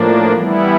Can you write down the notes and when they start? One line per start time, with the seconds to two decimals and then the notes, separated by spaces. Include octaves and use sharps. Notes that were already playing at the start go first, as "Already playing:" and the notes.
Already playing: A2 F3 A#3 D4
0.33 E3 G3 B3 E4